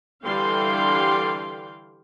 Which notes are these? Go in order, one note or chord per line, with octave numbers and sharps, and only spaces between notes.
D3 E3 G3 F5 G5 C6